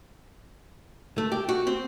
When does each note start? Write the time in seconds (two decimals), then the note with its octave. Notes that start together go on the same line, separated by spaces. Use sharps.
1.18 A3
1.32 G4
1.49 F#4
1.67 C4